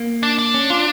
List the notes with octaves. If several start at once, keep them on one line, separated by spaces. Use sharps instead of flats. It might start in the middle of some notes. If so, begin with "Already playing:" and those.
Already playing: A#3
D4
D4
C#4
F4